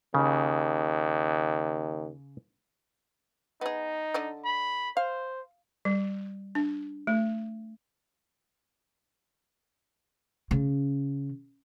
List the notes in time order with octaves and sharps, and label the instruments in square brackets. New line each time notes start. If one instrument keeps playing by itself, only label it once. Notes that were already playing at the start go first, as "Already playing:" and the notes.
[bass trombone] D#2 [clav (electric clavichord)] C#3
[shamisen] B3 G#4 [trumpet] D#4
[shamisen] D3 D5 D#5
[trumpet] B5
[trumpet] C5 [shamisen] F5
[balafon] G3
D4
A3
[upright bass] C#3